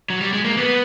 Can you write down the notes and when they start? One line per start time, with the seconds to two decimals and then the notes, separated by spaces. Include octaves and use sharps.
0.10 F#3
0.21 G3
0.33 G#3
0.45 A#3
0.57 B3